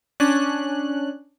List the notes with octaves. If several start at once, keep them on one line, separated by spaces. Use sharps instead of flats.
C#4 D4 F#6